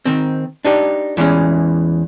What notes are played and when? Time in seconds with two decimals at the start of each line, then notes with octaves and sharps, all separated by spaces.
0.05 D#3 C4
0.65 D4 D#4 G4
1.17 E2 E3 G#3 C#4